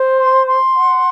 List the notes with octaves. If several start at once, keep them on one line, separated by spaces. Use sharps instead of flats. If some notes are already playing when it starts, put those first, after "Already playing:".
Already playing: C5
C6
C6
F#5